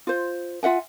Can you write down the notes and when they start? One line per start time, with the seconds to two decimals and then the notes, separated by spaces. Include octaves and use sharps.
0.07 F4 C5
0.63 F4 E5 F#5 G#5